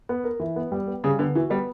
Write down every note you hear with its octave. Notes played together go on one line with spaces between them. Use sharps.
B3
A#4
E3
B3
G3
B3
C#3 G3
D3 B3
E3 F#4
G3 B3